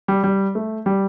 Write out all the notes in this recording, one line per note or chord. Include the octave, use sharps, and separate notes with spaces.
G3
G3
A3
G3